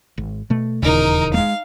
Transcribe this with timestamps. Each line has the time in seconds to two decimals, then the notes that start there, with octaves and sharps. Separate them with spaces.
0.18 G#1
0.50 B2 A3
0.82 D#1 E2 A#2 C#3 D#4 A#4
1.34 G#3 A3 F5